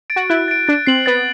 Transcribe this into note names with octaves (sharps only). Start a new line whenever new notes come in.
A6 D7
F#4
E4 F#6
A6 D7
D4 A6
C4 C7 F#7
B3 A6